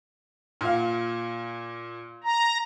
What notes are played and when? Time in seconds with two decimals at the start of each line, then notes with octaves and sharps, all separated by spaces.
0.61 A#2 F5
2.24 A#5